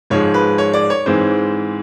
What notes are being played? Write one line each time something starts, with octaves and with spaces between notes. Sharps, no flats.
G#2 F3 G#3 C#5
B4
C#5
D5
C#5
G#2 E3 G#3 C4 C5